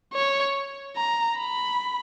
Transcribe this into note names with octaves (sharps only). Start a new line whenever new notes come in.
C#5
A#5
B5